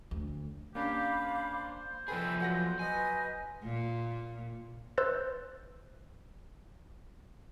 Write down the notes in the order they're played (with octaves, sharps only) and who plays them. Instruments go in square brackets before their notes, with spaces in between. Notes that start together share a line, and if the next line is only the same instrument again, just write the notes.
[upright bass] D2
[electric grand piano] A#3 C#4 D4 [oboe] G4 [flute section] F5 B5 D6
[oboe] C5
[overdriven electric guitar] F3 G#4 [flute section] A4 B4 [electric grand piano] G5 B5
[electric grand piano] F#3 F#5 A#6 [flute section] A4 B4
[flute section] B4 D#5 D#6 [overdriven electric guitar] G#5
[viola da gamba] A#2
[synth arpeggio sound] B4 C5 E6 F#6 G6 A6